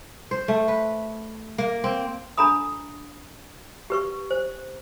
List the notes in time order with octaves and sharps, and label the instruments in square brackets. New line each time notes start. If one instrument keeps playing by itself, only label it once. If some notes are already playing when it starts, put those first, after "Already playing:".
[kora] C5
A3
B4
A#3
C4
[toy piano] D4 A4 A#5 B5 D#6
G4 B4 C#6
C5